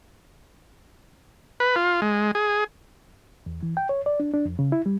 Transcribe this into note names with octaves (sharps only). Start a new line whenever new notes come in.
B4
F4
G#3
G#4
E2
E3
G5
C#5
D5
D4
D4
F2
C#3
E4
G3